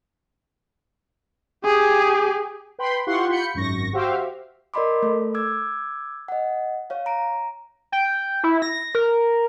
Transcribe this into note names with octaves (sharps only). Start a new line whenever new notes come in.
G4 G#4
B4 G5 B5 C6
E4 F4 G4 F#5 C6 C#6
F4 B5 G6 C#7
G#1 F#2 C#6 A#6
F#4 G4 C5 E5 F5
A#4 D5 D#5 B5 C6 D6
A3 A4
D6 E6 G#6
D#5 F#5
C#5 F5
A#5 D7
G5
E4
A#6
A#4